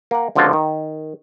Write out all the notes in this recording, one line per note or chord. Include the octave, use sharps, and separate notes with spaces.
A#3 F#5
C#2 D3 F3 C4 F4 F#4
D#3